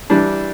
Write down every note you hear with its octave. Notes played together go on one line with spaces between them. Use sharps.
E3 G3 D4